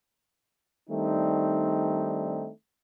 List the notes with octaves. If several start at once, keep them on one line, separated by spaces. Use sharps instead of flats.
D#3 G3 A3 C4 D4 D#4